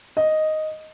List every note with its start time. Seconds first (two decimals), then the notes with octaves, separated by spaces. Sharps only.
0.17 D#5